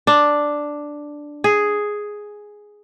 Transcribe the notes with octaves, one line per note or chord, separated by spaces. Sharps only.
D4
G#4